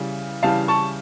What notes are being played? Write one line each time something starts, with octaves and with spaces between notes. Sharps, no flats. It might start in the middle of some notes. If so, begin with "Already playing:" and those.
Already playing: C#3 E3 G3
C#3 E3 G3 F5 A5
A5 C#6